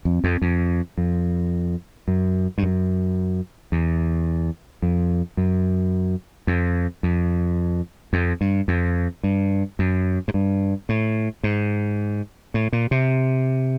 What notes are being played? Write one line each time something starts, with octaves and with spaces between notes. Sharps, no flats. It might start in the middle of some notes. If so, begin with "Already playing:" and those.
F2
F2
F2
F2
F#2
G2
F#2
E2
F2
F#2
F2
F2
F2
G2
F2
G2
F#2
G#2
G2
A2
G#2
A2
A#2
C3